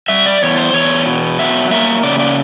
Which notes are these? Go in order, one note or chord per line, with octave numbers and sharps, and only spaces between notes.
G3 E5
D5
E2 C#5
C5
E2 C#5
B2
F#3 E5
A#3 E5
C#3 D5
D5